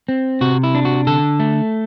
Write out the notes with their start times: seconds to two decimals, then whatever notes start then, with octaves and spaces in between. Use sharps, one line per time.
0.09 C4
0.41 C3 F#4
0.64 E4
0.75 D4
0.85 F#4
1.07 D3 A4
1.40 A3